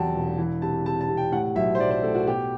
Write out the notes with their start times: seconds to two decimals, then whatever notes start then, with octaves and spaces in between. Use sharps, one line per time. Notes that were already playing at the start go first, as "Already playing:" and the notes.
Already playing: E2 C3 F#3 F#5 G5 A5
0.15 E1
0.38 E3
0.62 C3 A5
0.86 C3 A5
1.01 A5
1.08 C3
1.17 G5
1.32 A2 F#5
1.55 B1 E5
1.75 C5
1.80 B1 D5
1.91 C5
2.03 A2 A4
2.15 F#4
2.27 B2 G4